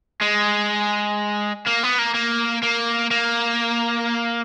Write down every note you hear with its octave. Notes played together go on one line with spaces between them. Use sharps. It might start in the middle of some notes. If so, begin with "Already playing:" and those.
G#3
A#3
B3
A#3
A#3
A#3
A#3